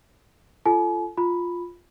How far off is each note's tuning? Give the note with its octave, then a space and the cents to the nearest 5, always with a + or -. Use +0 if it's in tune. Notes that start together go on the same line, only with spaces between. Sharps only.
F4 -25 A4 +0 G#5 +40
F4 +5 B5 +0